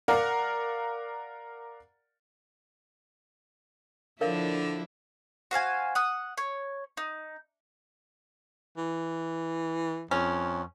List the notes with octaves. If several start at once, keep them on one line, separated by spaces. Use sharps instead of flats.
A#4 D5 F5 F#5
D3 F3 D4 E4 A#4 C#5 F5
F#4 C5 F5 G#5
F#5 D#6
C#5
D#4
E3
F2 C#4